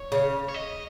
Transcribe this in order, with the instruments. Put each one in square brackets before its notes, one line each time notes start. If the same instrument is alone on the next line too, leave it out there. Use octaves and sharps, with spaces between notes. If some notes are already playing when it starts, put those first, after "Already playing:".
Already playing: [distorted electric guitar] C#5
[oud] C#3
[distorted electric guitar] C#5
D#5